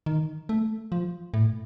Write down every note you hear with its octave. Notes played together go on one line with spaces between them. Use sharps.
D#3
A3
F3
A2